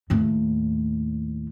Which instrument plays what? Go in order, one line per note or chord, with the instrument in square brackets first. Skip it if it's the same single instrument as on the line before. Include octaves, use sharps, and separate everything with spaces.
[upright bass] D#2 A2